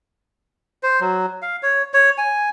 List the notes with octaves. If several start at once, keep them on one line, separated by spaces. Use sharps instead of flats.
C5
F#3
F5
C#5
C#5
G#5